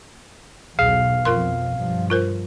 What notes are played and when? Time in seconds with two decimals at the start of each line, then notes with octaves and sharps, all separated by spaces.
0.79 B1 E2 B2 G#4 F5
1.25 F2 B2 F4 A#4 C6
1.77 G2 F3
2.10 F4 A#4 C5